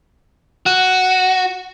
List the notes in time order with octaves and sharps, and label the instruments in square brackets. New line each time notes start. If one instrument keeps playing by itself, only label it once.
[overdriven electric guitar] F#4